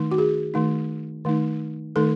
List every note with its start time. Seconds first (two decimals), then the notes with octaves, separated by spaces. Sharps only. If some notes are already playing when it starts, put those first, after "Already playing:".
Already playing: D#3 A3 D#4
0.11 F#4
0.18 G#4
0.54 D#3 A3 D#4
1.25 D#3 A3 D#4
1.96 D#3 A3 D#4 A4